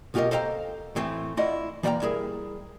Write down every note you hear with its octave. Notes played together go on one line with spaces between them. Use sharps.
B1 B2 F4 G4 A#4 D#5
A4 C5 D#5 F5 G5 A#5
A2 E3 A3 C4
A3 E4 F4 D5 D#5 F#5
E3 A#3 D5 F#5 G5 A#5
G3 E4 G#4 A#4